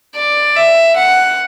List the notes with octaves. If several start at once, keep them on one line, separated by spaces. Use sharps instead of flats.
D5
E5
F#5